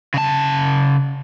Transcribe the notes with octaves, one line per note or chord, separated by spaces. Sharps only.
C#3 A5